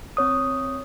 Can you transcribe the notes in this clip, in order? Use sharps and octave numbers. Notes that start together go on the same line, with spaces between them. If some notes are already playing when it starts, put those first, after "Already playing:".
C4 C#5 D#6